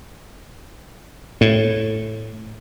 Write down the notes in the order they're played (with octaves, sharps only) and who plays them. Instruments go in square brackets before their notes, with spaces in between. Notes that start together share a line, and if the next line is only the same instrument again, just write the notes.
[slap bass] A2